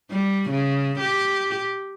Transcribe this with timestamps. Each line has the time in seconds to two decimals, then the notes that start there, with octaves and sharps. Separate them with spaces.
0.11 G3
0.50 C#3
1.00 G4